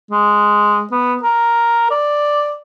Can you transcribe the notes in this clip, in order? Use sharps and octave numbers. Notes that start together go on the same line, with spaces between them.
G#3
B3
A#4
D5